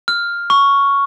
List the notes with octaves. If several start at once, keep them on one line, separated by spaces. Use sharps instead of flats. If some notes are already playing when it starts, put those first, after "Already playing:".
F6
C#6